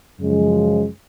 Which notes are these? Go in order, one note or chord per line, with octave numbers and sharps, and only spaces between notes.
F#2 C#3 F3 G#3